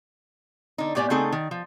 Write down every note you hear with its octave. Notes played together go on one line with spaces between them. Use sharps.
D3 D#4
A2 B3 G4 D5 G#5
C#3 A3 C4 D#4 G#4 A4
D#3
F3